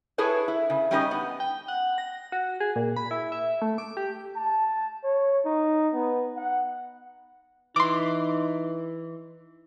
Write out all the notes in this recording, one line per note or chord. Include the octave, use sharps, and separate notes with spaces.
E4 G#4 A4 B4 C#5
E4
C#3
G3 C#4 D#4 G4 D5 D#5
B3
G5
F#5
A#6
F#4
G#4
A#2
B5
E4
E5
A3
D6
G4
A5
C#5
D#4
B3
F#5
E3 D#4 C6 D6